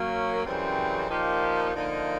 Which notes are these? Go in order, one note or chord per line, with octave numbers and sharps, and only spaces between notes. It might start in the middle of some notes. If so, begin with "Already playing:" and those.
Already playing: F#3 A#3 C#4
F#2 C#3 E3 G3 C4
A#2 F3 A#3 D#4 G4
D3 F3 A#3 D#4